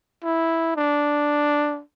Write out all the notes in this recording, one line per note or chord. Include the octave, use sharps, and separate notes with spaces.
E4
D4